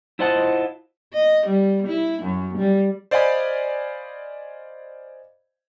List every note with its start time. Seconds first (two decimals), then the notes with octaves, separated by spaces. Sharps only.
0.19 E4 F4 C5 D#5 F#5 A5
1.13 D#5
1.46 G3
1.87 E4
2.22 F#2
2.58 G3
3.11 C5 D5 D#5 F5 G#5 B5